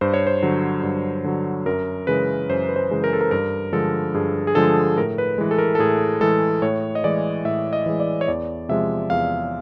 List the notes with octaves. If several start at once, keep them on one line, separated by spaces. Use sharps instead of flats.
G2 C5
C#5
C5
D3 F#3
G2
D3 F#3
F#2 A#4
C#3 E3 G#3 B4
F#2 C5
B4
C5
C#3 E3 G#3
A#4
A4
A#4
G2 A#4
D3 F3 G#3 A4
G2 G#4
G#4
D3 F3 G#3 A4
A2 A#4
B4
E3 G#3
A4
A#4
A4
A2 G#4
E3 G#3 A4
A2 C#5
D#5
E3 G#3 D5
A2 E5
D#5
E3 G#3
D5
C#5
E2 D5
C3 F3 G#3 E5
E2 F5